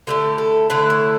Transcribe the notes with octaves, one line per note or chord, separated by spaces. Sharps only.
D3 A3 E4 G4
A4
D3 A3 E4 B4
C#5